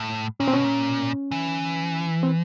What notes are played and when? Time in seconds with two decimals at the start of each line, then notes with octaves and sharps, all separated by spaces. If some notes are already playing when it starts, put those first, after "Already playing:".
Already playing: A2
0.40 A#2 C#4
0.48 C4
0.52 B2 C#4
0.64 A#2
1.31 E3
2.23 C4